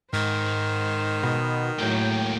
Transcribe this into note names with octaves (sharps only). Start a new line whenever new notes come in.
G#2 D#3 C5
B2
A2 F#3 G#3 A#3 G5